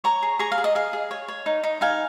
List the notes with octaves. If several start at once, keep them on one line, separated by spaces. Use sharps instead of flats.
C#5 A#5 C#6
G#4
G#4 A#5 C#6
F5
G#4
D#5
G#4 F5
G#4
C#5
C#5
D#4
D#4
D#4 F5 G#5